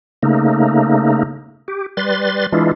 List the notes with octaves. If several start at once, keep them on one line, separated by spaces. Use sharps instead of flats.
C#3 A3 A#3 D#4
G4
G3 B4 C6 A6
E3 G#3 D4 E4 F4